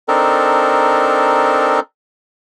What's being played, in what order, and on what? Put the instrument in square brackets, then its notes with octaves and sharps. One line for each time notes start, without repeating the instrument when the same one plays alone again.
[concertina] C4 D4 D#4 A4 A#4